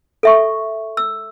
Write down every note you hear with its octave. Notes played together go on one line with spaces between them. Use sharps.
A4 E5 C#6
E6